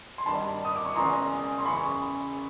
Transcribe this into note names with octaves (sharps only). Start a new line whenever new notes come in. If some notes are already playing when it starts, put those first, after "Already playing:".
C6
G#1 G2 D#3 G3 A5 B5
D#6
D6
C#6
E1 E2 C#3 E3 G#3 A#5 C6
C6
F#2 C#3 E3 B5 C#6